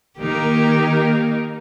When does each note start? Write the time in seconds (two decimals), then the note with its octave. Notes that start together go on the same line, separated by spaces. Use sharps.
0.19 D#3 A#3 D#4 G4 A#4